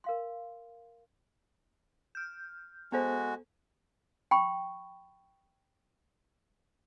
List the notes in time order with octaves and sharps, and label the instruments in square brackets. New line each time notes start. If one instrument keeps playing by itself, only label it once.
[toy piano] A#4 F5 C6
[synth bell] F6 G6
[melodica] G#3 F#4 [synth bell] B3 A4 C5
[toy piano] G5 B5 C#6